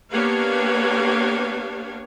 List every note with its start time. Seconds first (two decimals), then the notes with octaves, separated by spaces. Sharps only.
0.12 A#3 B3 D4 G4 C#5 F5